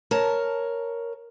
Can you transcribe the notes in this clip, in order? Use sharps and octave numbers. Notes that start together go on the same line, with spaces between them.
A#4 C#5 A5